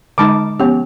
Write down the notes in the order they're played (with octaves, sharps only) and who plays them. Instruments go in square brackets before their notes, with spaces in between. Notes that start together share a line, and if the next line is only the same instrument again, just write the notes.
[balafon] D3 G#3 B5 [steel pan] D#4 A5 D6
[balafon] F3 B3 G4 [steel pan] C#4